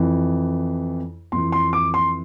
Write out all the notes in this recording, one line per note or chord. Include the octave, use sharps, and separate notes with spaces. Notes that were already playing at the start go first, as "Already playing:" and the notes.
Already playing: F2 E3
F2 E3 C6
C6
D6
C6